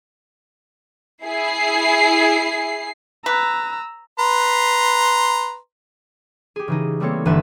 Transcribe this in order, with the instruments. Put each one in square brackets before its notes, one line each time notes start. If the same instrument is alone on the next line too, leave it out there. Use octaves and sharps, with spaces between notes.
[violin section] E4 G#4 C7
[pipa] B4 [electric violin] A#5 E6
[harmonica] B4 A#5 C6
[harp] G4 G#4
C#3 E3 D#4
G3 A3 A#3 C4 A4 C#5
G1 E3 C4 B4 E5 A5